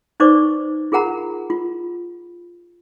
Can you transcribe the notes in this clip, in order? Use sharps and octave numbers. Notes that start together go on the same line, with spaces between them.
D#4 B4 C5 D5 C#6 D6
F4 G#4 A#4 F#5 A#5 B5
F4